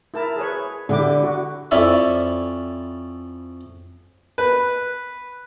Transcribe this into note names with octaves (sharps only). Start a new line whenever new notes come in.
E4 A#4 A5
G#4 B4 C#5
D3 E4 G4 D6
F#4
F2 C#4 E4 D5 E5
B4